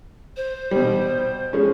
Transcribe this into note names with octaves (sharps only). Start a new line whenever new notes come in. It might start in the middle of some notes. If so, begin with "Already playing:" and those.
C5
B2 G3
F3 G#3 C#4